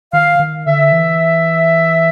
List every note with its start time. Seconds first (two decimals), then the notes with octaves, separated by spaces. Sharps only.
0.13 D#3 F5
0.40 D#3
0.65 D3 E5
0.92 E3